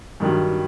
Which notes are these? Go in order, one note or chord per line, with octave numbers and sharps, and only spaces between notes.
G2 D#3 F#3